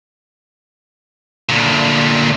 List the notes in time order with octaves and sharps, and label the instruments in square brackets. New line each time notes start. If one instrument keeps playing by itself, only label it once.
[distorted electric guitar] D2 A#2